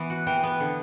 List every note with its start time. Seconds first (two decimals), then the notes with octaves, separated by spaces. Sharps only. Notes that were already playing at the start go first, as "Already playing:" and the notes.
Already playing: E3 B3
0.10 F#4
0.26 E3 G5
0.43 B3
0.60 D3